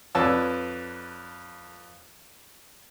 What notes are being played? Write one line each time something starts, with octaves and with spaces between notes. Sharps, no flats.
F2 B4 C#5 D5 A5 E6